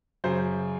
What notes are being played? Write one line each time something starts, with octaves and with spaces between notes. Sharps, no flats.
F#2 C#3 F#3 C5